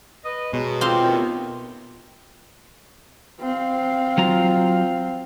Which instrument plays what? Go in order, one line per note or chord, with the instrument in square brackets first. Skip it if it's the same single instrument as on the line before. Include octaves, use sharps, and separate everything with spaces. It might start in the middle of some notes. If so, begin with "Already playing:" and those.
[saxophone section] B4 D#5
[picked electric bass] B2 [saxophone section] F#3 G#3
[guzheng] C4 F5 [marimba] F4 C6 D6
[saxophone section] D#2 A2 B3 [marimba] F4 G4 A#4
[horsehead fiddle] C4 F5
[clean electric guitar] F#3 F4 A#5